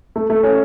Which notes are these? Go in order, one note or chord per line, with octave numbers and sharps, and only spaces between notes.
A3
A3
C#4